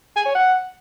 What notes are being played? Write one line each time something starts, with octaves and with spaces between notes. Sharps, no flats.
G#5
C#5
F#5